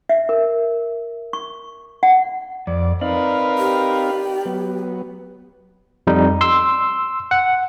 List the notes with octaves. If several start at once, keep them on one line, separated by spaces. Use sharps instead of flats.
E5
A#4
C#6
F#5
F2 D5
C4 D#4 A#4 B4 D5 F5
G4
F#3 B3
F2 G3 D#4
C6 E6
F#5